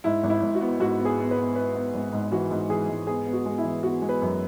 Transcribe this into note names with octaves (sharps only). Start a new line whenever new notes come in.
G#2 E4
G#1
E4
G#1
F#4
B3
G#2 F#4
B3
G#4
B3
B4
B3
B3 B4
B3
G#1
G#2
E3 F#4
G#2
E3 G#4
G#2
B3 G#4
B3
F#4
G#3
E4
E3
B3 F#4
G#3
B4
F#2